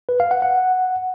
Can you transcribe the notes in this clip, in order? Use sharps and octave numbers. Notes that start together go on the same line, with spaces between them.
B4
F5
F#5
F#5